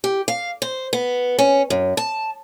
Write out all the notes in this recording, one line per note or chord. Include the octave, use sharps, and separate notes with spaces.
G4
F5
C5
B3
C#4
F#2
A5